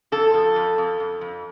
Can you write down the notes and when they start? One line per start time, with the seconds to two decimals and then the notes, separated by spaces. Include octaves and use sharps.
0.12 F2 A4
0.34 F3
0.56 F2
0.78 F2
1.00 F2
1.21 F2